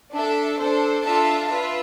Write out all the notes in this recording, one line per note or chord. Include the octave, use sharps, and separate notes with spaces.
D4 A4 E5
D4 A4 C5
D4 F4 A4 E5 A5
F4 B4 E5